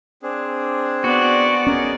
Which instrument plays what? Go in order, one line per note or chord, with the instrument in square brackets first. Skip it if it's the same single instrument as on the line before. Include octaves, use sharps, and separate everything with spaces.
[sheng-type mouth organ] C4 D4 G#4
[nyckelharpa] B3 D5 [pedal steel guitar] F#4
[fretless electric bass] C#4 [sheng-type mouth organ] G#4 A#4 D#5